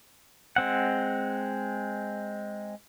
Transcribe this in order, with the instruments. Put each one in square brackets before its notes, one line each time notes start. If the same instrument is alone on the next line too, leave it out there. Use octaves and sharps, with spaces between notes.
[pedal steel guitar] G#3 C4 F#5